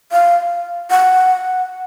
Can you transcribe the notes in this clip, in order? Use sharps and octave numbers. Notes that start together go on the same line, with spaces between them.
F5
F#5